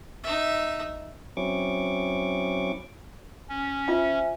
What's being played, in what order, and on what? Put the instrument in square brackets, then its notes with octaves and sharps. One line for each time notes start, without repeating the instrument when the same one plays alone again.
[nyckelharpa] D#4 E5
[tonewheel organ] F#3 C4 C#4 E4 C#6 D6
[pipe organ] C#4
[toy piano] F4 G5 [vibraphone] C5 E5 G#5